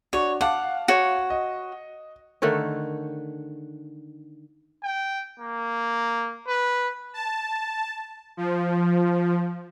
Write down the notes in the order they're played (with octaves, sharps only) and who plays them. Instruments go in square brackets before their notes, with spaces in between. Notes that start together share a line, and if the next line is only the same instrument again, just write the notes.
[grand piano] D4 F#4 [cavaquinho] C#5
[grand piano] F5 A5 D6 [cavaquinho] F#5
[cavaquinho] F#4 C#5
[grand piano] D#5
[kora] D3 D#3 A3 C#5
[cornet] G5
A#3
B4
[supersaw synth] A5
F3